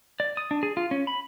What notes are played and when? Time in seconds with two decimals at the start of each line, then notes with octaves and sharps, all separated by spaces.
0.20 D5
0.37 D#6
0.51 D4
0.63 G#4
0.77 F4
0.91 C#4
1.07 B5